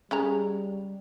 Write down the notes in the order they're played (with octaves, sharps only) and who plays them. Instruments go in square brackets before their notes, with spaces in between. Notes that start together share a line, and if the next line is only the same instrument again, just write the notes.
[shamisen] C#3 G#3 A#5 [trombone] G3